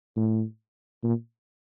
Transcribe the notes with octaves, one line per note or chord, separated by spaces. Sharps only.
A2
A#2